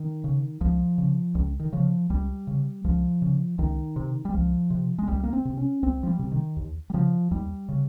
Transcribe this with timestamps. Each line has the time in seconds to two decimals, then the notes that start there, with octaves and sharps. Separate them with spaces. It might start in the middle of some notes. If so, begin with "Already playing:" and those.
Already playing: D#3
0.24 C#3
0.61 C#2 F3
0.98 C#3
1.35 C#2
1.60 D#3
1.73 C#3 F3
2.10 C#2 G3
2.47 C#3
2.84 C#2 F3
3.22 C#3
3.58 C#2 D#3
3.96 C3
4.25 G3
4.33 C#2 F3
4.70 C3
4.99 G#3
5.07 C#2 G3
5.23 A#3
5.33 C4
5.45 C3
5.57 C#4
5.83 C#2 C4
6.03 F3
6.07 G3
6.19 C3
6.32 D#3
6.57 D#2
6.90 G3
6.93 C#3 F3
7.31 D#2 G3
7.69 C#3